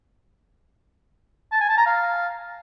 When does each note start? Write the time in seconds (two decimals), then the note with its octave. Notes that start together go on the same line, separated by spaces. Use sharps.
1.52 A5
1.61 G#5
1.69 A5
1.78 A#5
1.86 F5